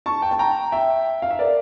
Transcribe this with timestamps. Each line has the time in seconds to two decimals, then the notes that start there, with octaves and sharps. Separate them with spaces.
0.06 A5 C#6
0.22 G5
0.31 A5
0.39 G5 A#5
0.72 E5 G5
1.22 F5
1.30 E5
1.39 A#4 D5